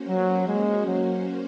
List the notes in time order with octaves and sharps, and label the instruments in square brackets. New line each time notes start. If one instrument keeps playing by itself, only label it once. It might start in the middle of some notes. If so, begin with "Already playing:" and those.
Already playing: [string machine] A#3 C#4 F#4 C5
[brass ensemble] F#3
G#3
F#3